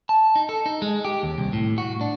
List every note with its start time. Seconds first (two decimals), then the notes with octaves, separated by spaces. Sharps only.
0.09 A5
0.36 D#4
0.49 A4
0.66 D#4
0.82 G#3
1.05 G4
1.23 D#2
1.38 C2
1.53 A2
1.78 F#4
2.01 D4